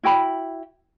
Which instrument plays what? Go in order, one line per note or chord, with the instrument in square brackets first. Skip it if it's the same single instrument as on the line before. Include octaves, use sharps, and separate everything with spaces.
[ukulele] E4 F#4 G5 B5